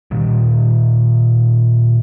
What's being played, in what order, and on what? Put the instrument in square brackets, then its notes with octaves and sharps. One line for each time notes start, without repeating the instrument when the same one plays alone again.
[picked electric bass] A#2 D#3 G3